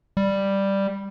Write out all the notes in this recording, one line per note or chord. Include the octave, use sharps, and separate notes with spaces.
G3